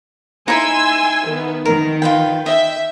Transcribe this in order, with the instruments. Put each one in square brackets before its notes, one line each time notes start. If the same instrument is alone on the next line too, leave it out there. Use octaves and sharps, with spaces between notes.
[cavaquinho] D#4 E4 [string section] G#5 C6 E6
[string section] D#3 B3
[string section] D#3 [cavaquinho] A#4
[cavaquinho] F4 B4 G5
[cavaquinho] D#5 G5 [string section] E5